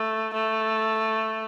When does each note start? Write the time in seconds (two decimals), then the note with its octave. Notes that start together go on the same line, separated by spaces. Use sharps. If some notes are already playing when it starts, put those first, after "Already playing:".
Already playing: A3
0.34 A3